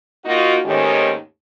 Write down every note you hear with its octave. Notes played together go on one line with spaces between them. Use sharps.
A#3 D#4 F4 F#4
D#2 G#2 D#3 A3 C#4 G4